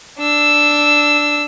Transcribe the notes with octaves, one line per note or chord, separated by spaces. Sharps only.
D4 E6